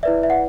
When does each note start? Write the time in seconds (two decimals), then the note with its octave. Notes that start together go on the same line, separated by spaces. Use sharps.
0.03 E4 B4 D5 E5
0.23 E5
0.30 F#5